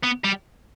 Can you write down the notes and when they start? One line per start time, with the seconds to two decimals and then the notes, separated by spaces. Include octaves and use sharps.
0.04 B3
0.25 G3